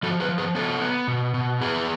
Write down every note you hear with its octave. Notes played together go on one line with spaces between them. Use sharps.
F3 F#4 A4
G#4 B4
F3
G#4 B4
B3 A4 C#5
B3
B2
B2
B3 G#4 B4